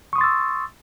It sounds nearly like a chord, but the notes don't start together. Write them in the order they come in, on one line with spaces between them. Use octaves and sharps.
C#6 D#6 C6 A6 E6